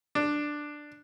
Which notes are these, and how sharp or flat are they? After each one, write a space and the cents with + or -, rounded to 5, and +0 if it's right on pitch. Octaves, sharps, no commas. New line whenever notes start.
D4 +5